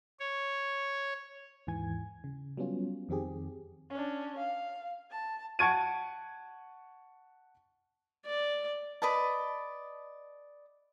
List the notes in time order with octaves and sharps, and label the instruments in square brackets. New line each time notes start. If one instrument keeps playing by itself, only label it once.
[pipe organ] C#5
[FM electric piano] D#2 G#2 E3 G#5 G#6
C#3
F#3 G3 B3 C#4 F4
F2 D#3 C4 G4 G#4
[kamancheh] C#4 D4
F5
A5
[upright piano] F#5 A5 C#6 G#6 D7 D#7
[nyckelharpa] D5
[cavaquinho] B4 D5 D#5 A5